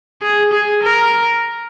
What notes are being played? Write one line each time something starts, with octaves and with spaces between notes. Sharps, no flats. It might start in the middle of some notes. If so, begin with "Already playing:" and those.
G#4
G#4
A#4